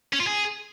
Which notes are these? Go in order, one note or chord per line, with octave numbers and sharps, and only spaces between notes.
C#4
F4
G#4